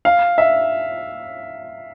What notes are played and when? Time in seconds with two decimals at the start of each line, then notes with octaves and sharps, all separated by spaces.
0.05 F5
0.38 E5